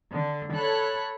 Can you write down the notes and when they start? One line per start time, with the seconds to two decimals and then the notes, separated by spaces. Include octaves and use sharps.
0.13 D3
0.54 A4 C#5 B5 F#6